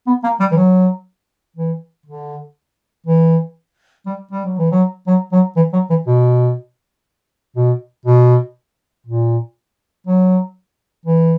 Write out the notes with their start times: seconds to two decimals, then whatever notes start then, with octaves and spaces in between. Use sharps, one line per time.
0.07 B3
0.24 A#3
0.40 G3
0.52 E3
0.57 F#3
1.57 E3
2.06 D3
3.07 E3
4.06 G3
4.31 G3
4.45 F#3
4.59 E3
4.71 F#3
5.07 F#3
5.32 F#3
5.56 E3
5.73 F#3
5.90 E3
6.07 B2
7.56 B2
8.06 B2
9.07 A#2
10.07 F#3
11.06 E3